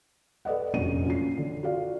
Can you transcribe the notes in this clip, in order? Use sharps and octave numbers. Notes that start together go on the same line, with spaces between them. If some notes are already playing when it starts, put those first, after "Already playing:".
A4 B4 D5 D#5 F#5
F1 F#2 A#2 C#4 D4 D#7
C#4 F4 C7
D3
F4 F#4 A4 D5 F5